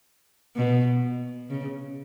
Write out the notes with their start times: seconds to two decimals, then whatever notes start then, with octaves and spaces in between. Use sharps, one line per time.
0.56 B2
1.50 C#3